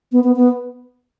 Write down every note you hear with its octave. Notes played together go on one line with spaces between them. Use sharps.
B3
B3
B3